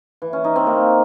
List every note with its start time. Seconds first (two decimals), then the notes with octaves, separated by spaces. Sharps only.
0.22 E3
0.33 C#4
0.44 D#4
0.56 C4
0.67 A#3